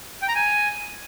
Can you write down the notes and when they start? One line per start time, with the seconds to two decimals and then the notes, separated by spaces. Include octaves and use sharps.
0.22 G5
0.28 A#5
0.35 G#5